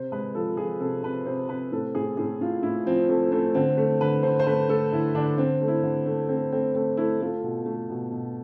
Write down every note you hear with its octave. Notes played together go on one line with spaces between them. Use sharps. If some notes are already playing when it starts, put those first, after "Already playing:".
Already playing: C3 C5
G#3 B4
F3 A4
F3 G#4
C3 A4
C3 B4
C3 C5
C3 B4
A2 A4
A2 G#4
A2 G#4
A2 F4
A2 E4
F3 C4
A3 C4
A3 C4
D3 C4
A3
D3 B4
D3 C5
C5
A3 B4
A3 A4
D3 E4
D3 D4
D3 C4
A3
E4
D3
A3
A3 C4
A3 C4
A3 C4
A3 E4
A3 F4
B2
A3
B2
B2